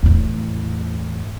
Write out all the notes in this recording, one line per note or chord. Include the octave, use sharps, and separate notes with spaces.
E2 A2